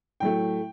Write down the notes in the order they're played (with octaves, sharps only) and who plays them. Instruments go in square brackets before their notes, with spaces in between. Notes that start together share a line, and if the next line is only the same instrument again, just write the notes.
[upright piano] A2 F#3 A3 G5